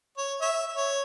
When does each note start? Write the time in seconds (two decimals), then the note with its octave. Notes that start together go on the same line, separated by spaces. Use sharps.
0.18 C#5
0.41 C#5 E5
0.77 C#5